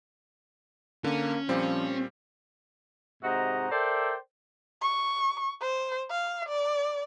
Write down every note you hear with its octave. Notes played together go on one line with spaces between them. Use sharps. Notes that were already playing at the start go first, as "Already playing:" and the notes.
D3 A#3 C#4
A#2 F3 G3 C4
G#2 C3 F#4 C5 D#5 A#5
A4 A#4 C5 D5 E5 G5
C#6
C5
F5
D5